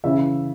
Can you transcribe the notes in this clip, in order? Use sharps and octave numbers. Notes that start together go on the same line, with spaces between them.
C#3 E3 E5